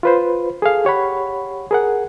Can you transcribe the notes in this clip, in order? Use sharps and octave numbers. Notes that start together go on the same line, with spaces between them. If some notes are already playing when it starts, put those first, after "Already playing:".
F4 B4 C5
G#4 A4 F5
G4 C#5 F#5 B5
G#4 A#4 F#5